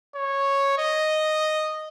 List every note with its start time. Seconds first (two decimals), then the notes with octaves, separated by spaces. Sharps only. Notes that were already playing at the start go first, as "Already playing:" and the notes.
0.15 C#5
0.78 D#5